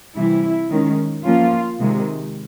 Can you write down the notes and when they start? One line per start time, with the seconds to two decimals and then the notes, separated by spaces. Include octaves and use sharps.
0.15 C3 E3 G3 E4
0.70 D#3 G#3 C#4
1.24 F3 A#3 C#4 F4
1.79 C3 D#3 G#3